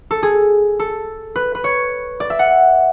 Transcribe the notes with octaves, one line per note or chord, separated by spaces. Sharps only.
A4
G#4
A4
B4
B4
C#5
D5
E5
F#5